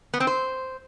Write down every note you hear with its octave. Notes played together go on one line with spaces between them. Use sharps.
B3
C4
C5